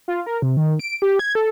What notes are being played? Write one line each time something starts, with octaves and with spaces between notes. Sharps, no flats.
F4
A#4
C3
D#3
D7
G4
G#6
A4